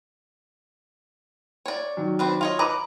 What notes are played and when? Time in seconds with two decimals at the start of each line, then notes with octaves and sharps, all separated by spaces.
1.66 C#5 D5
1.97 D#3 F#3
2.19 C4 D4 B4
2.41 F4 C#5 D#5
2.59 D#4 B4 A#5 D6